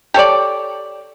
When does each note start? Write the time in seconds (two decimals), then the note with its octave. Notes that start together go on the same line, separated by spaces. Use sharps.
0.14 G4 A4 C#5 D5